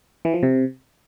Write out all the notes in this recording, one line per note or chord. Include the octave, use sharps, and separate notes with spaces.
E3
F3
C3